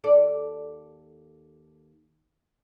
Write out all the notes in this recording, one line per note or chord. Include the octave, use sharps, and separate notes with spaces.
D#2 A4 D5